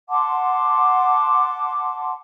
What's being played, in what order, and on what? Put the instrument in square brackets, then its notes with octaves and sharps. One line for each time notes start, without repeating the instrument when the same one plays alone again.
[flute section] F#5 A5 C6 D6